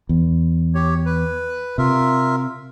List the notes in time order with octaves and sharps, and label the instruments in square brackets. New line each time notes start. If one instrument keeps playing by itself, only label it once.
[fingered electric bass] E2
[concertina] G4 C#5
B4
[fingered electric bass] C3 [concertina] F4 A#4 E5